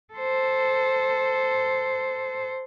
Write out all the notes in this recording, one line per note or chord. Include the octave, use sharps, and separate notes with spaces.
A4 C5